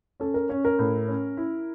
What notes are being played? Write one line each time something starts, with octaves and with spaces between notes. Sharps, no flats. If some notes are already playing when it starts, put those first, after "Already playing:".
C#4 A4
A#4
C#4 C#5
A#4
A2
C#4
E4